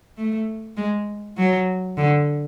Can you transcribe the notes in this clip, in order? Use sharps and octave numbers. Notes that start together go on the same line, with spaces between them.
A3
G#3
F#3
D3